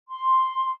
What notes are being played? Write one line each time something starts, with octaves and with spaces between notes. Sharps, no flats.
C6